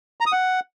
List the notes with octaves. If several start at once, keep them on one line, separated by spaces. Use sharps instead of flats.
A#5
D#6
F#5